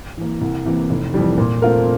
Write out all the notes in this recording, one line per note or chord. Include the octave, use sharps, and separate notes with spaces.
E3 A#3
C2
C3 E3 A#3
F1
F2 E3 G3
A#2
A3 C4 F4 A#4